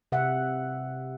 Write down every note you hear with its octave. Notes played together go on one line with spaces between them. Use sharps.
C3 E5 F#5